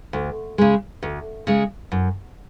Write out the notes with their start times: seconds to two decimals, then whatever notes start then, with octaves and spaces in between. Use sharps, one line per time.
0.13 D2
0.58 C#3 G#3
1.03 D2
1.47 C#3 G#3
1.92 F#2